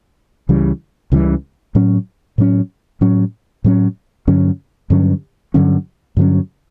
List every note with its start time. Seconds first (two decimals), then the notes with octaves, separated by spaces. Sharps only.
0.49 C#2 C#3 E3 G3
1.12 C#2 C#3 E3 G3
1.75 A2 F#3 C#4
2.38 A2 F#3 C#4
3.01 A2 F#3 C#4
3.64 A2 F#3 C#4
4.27 G2 D3 F#3 C#4
4.90 G2 D3 F#3 C#4
5.54 G2 D3 F#3 C#4
6.17 G2 D3 F#3 C#4